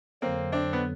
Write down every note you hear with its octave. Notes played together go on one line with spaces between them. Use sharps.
F2 D3 F#3 A#3 C4
C4 D4
B3